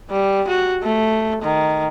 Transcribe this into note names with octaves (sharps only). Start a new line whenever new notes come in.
G3
F#4
A3
D#3